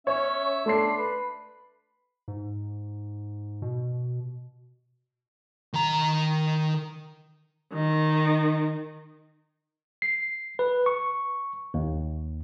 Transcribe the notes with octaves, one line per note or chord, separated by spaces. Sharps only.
C#4 C#5 E5
A3 D4 C6 C7
B4
G#2
B2
D#3 A#5
D#3
C7
B4
C#6
D#2